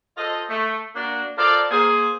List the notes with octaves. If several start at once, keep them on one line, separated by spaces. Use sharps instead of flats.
F4 A4 C5 D#5
A3
A#3 D4 F#4
F4 A4 A#4 C5 D5
A#3 G#4 C5